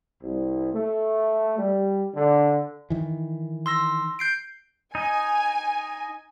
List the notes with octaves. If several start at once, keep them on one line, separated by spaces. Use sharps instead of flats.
C2
A3
G3
D3
D#3 E3
C6 E6 A#6
G6 C7 D7
D#4 D#5 G#5